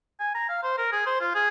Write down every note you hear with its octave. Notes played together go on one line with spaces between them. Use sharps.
G#5
A#5
F5
C5
A#4
G#4
C5
F4
G#4